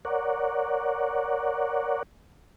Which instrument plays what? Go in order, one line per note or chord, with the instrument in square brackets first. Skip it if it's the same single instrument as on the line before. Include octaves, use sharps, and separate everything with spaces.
[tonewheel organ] A#4 C#5 D5 F#5